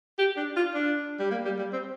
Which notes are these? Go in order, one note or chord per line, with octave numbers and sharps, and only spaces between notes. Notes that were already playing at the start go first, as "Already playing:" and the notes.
G4
D4
F4
D4
G3
A#3
G3
G3
C4